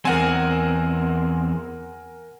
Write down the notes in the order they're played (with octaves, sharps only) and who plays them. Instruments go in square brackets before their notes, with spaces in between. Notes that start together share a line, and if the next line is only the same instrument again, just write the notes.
[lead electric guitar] E2 C4 [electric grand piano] A#4 F#5 G#5